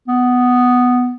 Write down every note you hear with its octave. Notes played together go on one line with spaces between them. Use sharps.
B3